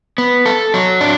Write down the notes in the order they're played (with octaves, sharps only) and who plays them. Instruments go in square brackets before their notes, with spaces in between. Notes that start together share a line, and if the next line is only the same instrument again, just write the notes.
[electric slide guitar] B3
A4
F#3
D4